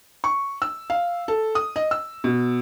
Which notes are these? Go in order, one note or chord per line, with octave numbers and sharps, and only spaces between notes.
C#6
E6
F5
A4
D#6
D#5
E6
B2